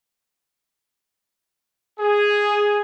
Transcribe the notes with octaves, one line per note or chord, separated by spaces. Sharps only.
G#4